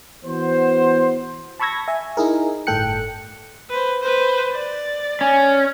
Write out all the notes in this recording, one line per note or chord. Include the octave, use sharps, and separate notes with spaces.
E3 B3 F#4 C5
A5 B5 C#6 E6 G#6 A#6
E5 G#5
D#4 E4 G#4 A#4
G1 A2 A4 G5 F#6 C#7
B4 C5
B4 C5
D5
C#4